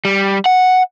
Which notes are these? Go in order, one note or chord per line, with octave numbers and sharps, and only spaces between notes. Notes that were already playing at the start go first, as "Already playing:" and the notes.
G3
F#5